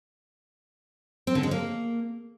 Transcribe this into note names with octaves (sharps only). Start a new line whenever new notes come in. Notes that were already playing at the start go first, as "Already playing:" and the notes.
C4
D3
G#3
A#3